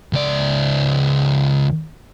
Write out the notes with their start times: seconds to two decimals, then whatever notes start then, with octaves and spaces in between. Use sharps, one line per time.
0.13 C#2 D5